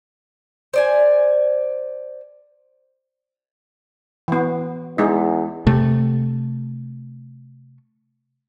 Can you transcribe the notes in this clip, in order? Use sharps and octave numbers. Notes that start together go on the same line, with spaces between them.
C5 D5 G#5
E3 B3
E2 G#3 D#4
C3 A3